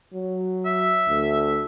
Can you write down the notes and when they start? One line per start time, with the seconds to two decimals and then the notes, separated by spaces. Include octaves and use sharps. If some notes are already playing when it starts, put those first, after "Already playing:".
0.14 F#3
0.65 E5
1.08 D2